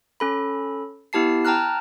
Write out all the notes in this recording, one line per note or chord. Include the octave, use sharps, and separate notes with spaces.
C#4 A4 B5
B3 E4 G4 A5 C7
G5 A5 A#5 F6 F#6